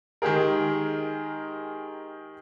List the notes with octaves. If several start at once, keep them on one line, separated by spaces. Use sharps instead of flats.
D#3 G#3 G4 G#4 A#4